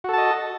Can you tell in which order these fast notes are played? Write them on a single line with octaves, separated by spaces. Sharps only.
F#4 A4 A5 D#5